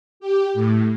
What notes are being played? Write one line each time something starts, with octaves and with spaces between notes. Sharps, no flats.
G4
A2